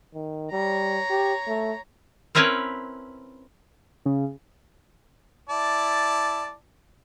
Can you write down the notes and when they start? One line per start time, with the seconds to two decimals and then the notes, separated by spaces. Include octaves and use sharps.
0.14 D#3
0.52 G3 C#5 A#5
1.10 G4
1.48 A3
2.35 C4 C#4 E4 A#4 B4 C#5
4.05 C#3
5.49 E4 D5 A5